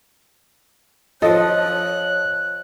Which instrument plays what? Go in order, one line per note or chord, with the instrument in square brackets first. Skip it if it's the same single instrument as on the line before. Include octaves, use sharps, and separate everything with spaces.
[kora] F3 A4 [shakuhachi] C#5 [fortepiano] D#5 [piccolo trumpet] F#6